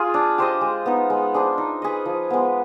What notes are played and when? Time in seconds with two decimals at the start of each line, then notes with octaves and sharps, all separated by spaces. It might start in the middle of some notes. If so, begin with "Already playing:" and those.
Already playing: F4 G#4
0.14 D4
0.38 G4 C5 D#5
0.61 G#3
0.86 B3 D#4
1.10 G#3
1.34 D4 G#4 C5
1.58 D#4
1.82 G#4 B4 D#5
2.05 F3
2.30 G#3 B3